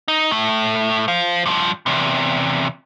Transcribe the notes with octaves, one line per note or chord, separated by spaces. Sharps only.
D#4
A2 A3
C5 F5
G2 F3
E2 C3